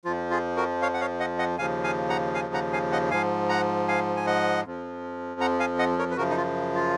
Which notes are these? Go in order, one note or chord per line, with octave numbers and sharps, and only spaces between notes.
F2 F3 F4
F4 G#4
F#4 A#4
C#5 F5
F#5
C#5 F5
D#5 F#5
D#5 F#5
D#2 C#3 F3 F5 G#5
F5 G#5
F#5 A#5
F5 G#5
F#5 A#5
F5 G#5
D#5 F#5
G#2 F3 F5 G#5
F#5 A#5
F5 G#5
G#5
D#5 F#5
F2 F3
F#5 A#5
F5 G#5
D#5 F#5
A#4 C#5
B4
F#2 C#3 F3 F#4 A#4
D#4
F4
F4